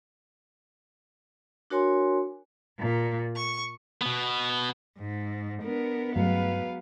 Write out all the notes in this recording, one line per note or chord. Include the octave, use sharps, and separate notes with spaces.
D4 F#4 A#4 C#5 G#5 C6
A#2
C#6
B2 B3
G#2
B3 D4 A#4
G2 F#3 G#3 A3 B4 F5